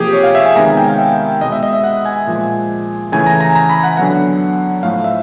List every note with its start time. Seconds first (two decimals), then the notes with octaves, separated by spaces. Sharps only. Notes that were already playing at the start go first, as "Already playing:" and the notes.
Already playing: C3 F3 A#3 G4 G#4
0.13 C#5
0.23 F5
0.35 E5
0.46 G#5
0.56 C3 D#3 G#3 B3 A#5
0.67 G#5
0.77 G5
0.88 F5
0.98 E5
1.41 B2 G#3 B3 D#5
1.52 E5
1.63 D#5
1.73 E5
1.84 F#5
2.06 G#5
2.27 A#2 F3 G#3
3.12 C#3 E3 A3 G#5
3.26 A#5
3.41 A#5
3.55 A#5
3.70 B5
3.83 F#5
3.97 D3 F#3 B3 F#5
4.83 A2 F3 A3 F5
5.04 E5